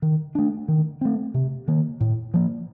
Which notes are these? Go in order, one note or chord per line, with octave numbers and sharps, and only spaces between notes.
D#3
A3 D4
D#3
A3 C4
C3
D#3 A#3
A2
F3 A#3